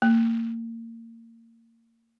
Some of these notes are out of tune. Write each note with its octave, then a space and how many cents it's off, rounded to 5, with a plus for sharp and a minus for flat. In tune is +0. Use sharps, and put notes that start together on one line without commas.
A#3 -30